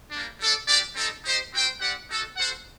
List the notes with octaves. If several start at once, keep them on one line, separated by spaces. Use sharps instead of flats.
G3 A#3 D4
G3 D4 A4 D5
A3 D4 G4 D5
G3 C4 D#4 A4
D#4 G4 C5 D#5
C4 F#4 C5 G5
C4 G4 D5 F#5
D#4 F#4 A4
F#4 A4 C5 F#5